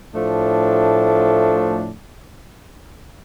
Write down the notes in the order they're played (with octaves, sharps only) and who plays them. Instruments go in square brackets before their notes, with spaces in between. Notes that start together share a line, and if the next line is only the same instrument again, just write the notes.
[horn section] A2 F3 A3 D4